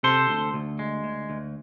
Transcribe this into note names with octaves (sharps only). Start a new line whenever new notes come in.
C3 A4 C5
D2
D2
G#3
D2
D2